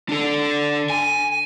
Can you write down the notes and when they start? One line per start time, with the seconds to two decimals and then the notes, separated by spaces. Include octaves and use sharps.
0.09 D4 A4
0.90 G#5